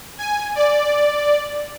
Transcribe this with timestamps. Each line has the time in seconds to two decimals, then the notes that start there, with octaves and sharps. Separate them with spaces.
0.18 G#5
0.55 D5